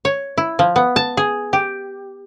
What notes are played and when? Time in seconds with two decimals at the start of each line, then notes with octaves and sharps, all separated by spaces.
0.05 C#5
0.38 E4
0.59 F3
0.76 B3
0.96 A5
1.17 G#4
1.53 G4